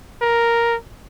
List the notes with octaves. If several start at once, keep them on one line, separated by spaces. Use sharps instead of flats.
A#4